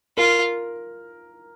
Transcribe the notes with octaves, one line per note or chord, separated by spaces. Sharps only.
F4 A#4